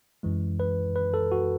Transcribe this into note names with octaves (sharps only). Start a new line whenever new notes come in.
F#2 E3 G#3
B4
B4
A4
F#4